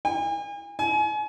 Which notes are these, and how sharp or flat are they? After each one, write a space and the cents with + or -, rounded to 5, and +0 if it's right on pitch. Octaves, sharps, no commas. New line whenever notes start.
G#5 -40
G#5 +35